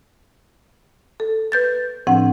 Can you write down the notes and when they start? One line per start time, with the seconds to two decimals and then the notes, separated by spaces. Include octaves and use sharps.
1.20 A4
1.52 B4 G6 A6
2.07 A2 F3 C4 D4 F#5